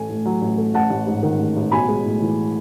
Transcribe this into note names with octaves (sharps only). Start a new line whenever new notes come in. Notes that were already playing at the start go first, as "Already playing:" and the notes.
Already playing: A1 A3 G#5
A2
F#3
A1
A3
A1 F#5 A5
A1
G#2
D#3
A1
A1
B1 G#5 B5
G#3
A2
E3